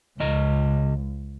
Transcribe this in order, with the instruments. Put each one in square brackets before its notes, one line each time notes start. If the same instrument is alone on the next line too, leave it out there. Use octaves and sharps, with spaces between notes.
[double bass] C#2 [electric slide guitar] C#3 D#5 A#5